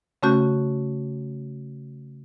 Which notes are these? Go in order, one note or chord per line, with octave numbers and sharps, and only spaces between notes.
C#3 A3 C#4 F#4 G6